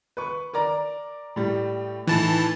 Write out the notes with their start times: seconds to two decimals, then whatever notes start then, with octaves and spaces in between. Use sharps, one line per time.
0.17 B4 C#6
0.53 A#4 D5 A#5
1.36 A2 G3
2.07 A2 D#3 E3 A5